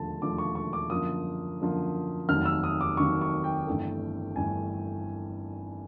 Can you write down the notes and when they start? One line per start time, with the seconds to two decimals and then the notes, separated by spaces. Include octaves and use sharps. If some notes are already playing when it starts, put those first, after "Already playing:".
Already playing: E1 D#2 D3 F3 A3 A5
0.21 E1 D#2 D3 F3 A3 D6
0.38 C#6
0.55 C#6
0.73 D6
0.90 F#2 D3 F3 A#3 D#6
1.59 F#2 D3 F3 A#3
2.28 F1 D#2 D#3 F#3 F6
2.45 E6
2.64 D#6
2.81 D6
2.97 F1 D#2 D#3 F#3 C#6
3.21 C#6
3.44 G5
3.67 G1 G2 E3 A3
4.36 G1 G2 E3 A3 G#5